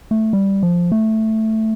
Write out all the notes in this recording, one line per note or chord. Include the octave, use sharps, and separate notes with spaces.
A3
G3
F3
A3